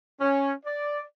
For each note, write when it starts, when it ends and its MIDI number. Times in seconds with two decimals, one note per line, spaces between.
0.20 0.53 61
0.66 0.99 74